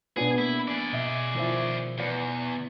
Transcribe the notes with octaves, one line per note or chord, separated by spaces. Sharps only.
B2 B3 D4 G#4 B4
A#3 E4
G#4 D5
B2 D#5 E5
D#3 F3 E4
E2 B3 D5